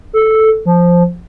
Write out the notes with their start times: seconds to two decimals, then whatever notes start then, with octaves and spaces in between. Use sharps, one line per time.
0.13 A4
0.65 F3